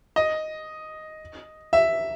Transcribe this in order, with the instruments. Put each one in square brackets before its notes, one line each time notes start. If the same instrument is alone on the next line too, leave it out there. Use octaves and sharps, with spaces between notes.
[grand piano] D#5
E5